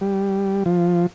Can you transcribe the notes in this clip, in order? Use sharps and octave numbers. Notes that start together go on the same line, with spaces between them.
G3
F3